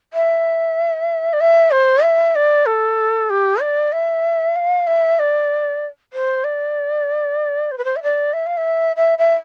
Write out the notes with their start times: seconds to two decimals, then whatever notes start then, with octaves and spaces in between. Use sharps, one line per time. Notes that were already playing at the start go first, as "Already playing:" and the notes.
0.13 E5
1.33 D5
1.40 E5
1.71 C5
2.03 E5
2.35 D5
2.66 A4
3.29 G4
3.61 D5
3.92 E5
4.55 F5
4.87 E5
5.19 D5
6.13 C5
6.44 D5
7.71 C5
7.78 B4
7.84 C5
7.96 E5
8.03 D5
8.33 E5
8.46 F5
8.57 E5
8.96 E5
9.18 E5